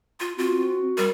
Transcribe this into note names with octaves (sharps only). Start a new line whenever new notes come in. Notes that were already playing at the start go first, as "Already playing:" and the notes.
F4
C4 F4 F#4
C4
G3 A#4